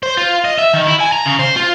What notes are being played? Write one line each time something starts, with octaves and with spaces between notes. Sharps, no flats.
C5
F4
D#5
E5
D#3
E4
G#5
A#5
C#3
C5
F4